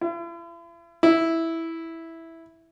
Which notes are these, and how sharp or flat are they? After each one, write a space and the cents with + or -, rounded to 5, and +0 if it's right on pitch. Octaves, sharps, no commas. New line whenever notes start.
E4 +45
E4 -5